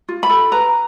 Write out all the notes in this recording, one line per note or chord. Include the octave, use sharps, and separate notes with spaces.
F4
B5
A4
B4 A#5